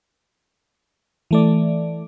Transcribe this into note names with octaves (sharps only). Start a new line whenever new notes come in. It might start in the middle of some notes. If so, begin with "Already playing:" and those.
E3 A3 D5